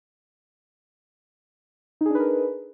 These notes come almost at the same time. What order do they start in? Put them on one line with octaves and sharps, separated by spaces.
D#4 G#4 D4 B4 A#4